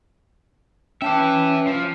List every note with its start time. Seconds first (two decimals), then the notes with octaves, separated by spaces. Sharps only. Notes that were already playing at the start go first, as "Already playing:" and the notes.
1.02 C#4 B4 E5 G5 A5 D6
1.67 F3